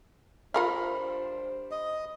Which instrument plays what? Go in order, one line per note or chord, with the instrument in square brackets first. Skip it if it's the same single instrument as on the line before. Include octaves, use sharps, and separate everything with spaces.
[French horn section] G3 D4 C5 [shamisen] F4 A#4 F5 [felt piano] B5
[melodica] D#5